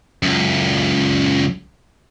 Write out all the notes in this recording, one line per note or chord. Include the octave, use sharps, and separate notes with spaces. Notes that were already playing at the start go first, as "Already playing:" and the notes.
C#2 F#2